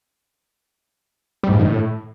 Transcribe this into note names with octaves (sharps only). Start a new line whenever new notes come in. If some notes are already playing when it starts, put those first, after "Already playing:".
G3
G#2
G2
D#3
A2